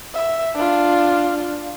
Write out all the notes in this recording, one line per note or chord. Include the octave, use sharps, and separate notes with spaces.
E5
D4 F4